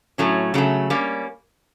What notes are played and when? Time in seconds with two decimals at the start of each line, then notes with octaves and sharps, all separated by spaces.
0.18 A2 F#3 A3 C#4
0.54 C#3 F#3 A3
0.90 G3 A#3 C#4